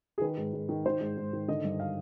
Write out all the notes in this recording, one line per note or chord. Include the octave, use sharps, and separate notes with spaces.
G#4
D#3 B4
G#2
G#2
D#3
D#3 C5
G#2
G#2
D#3
D3 D#5
G2
F5